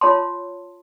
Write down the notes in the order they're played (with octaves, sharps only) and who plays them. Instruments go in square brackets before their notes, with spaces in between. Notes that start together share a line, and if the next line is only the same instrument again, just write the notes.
[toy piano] F4 C#5 A5 C6